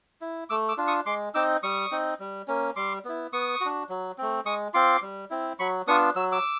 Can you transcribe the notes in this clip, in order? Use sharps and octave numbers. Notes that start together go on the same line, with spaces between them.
E4
A3 D6 E6
D6 E6
D4 F4
C#6 D#6
G#3 C6 D6
C4 D#4 D6 E6
G3 C#6 D#6
C4 D#4
G3
A#3 C#4
G3 C6 D6
B3 E4
B3 C#6 D#6
D4 F#4
F#3
A3 C4
G#3 C#6 D#6
C4 F4 C6 D6
G3
C4 E4
F#3 B5 C#6
B3 D4 F4 C#6 D#6
F#3 E6
D6 E6